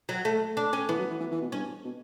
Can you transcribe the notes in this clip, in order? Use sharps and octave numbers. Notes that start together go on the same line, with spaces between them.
F#3
A3
D4
C#4
E3 B3
F#3
E3
E3
E3
B2
G2 C#4
B2